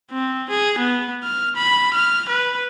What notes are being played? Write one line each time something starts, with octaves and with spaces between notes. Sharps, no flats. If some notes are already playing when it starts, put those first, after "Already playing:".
C4
G#4
B3
F6
B5
F6
B4